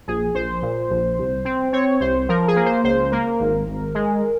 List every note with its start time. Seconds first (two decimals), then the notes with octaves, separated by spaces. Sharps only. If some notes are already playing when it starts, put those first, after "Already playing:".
0.07 A#1 G#4
0.34 A#1 C5
0.62 A#2
0.90 A#1
1.18 C2
1.45 C4
1.73 C4 C#5
2.00 C2 C5
2.28 F3 A#4
2.48 G#4
2.56 A#3
2.65 C5
2.83 C#2 C5
3.12 A#3 A#4
3.40 G#1
3.67 G#1
3.94 G#3